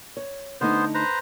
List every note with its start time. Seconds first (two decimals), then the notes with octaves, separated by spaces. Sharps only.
0.17 C#5
0.61 D3 A3 B3 D#4 C5
0.94 B4 C5 A#5